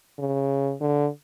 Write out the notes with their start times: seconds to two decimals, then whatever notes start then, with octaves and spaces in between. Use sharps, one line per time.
0.19 C#3
0.81 D3